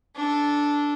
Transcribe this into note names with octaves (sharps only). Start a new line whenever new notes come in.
D4 A4